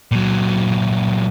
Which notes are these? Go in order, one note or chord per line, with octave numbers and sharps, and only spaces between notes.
A#2 F#3